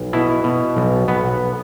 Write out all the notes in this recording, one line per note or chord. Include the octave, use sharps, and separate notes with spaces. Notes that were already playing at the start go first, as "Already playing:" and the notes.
Already playing: B1
B2 E4
B2
B1
B1 B3